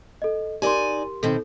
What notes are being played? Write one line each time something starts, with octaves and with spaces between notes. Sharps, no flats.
A4 D#5
D#4 G4 A#4 D5 G#5 C6
B2 D#3 C4 A4